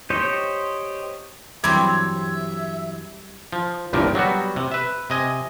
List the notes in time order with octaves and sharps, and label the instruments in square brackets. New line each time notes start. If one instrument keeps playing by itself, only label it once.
[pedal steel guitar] G4 C5 C#5 D#5 G5
[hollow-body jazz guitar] G2 E3 F#3 [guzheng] G3 C4 [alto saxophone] E5 [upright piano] G#6
[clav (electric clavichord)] F3
G1 C2 G2 A#2 F3 A#4
F#3 G3 B3 F#4
C3
B4 E5
C3 D#5 G#5